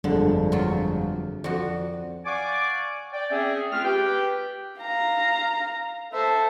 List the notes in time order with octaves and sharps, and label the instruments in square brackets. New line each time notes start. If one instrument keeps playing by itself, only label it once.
[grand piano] G1 F2 G#3 [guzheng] D3
[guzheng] F#3 F4
[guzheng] F2 F#4 [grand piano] D5
[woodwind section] D5 F5 F#5 G#5 C#6 D6
D5 G5
C4 C#4 G#4 E5
A3 C4 F4 G#4 B4 F6
G4 B4 G5
[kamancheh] F5 A#5
[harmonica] A4 E5 [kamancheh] C5